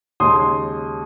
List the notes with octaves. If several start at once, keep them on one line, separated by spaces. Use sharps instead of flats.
D#2 C#3 G#3 C#4 C6 D#6